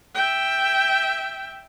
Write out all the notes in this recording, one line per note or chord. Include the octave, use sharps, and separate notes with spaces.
E5 G5